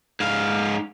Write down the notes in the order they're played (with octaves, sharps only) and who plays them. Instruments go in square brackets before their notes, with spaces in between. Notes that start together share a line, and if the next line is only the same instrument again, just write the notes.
[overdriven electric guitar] G#2 F5